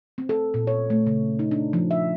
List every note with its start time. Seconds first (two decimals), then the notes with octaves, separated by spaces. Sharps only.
0.18 C4
0.29 A4
0.54 A#2
0.67 C#5
0.90 A3
1.07 C#3
1.39 D#4
1.51 D4
1.73 F3
1.91 E5